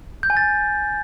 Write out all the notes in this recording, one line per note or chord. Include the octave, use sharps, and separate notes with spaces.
G6
G#5
A6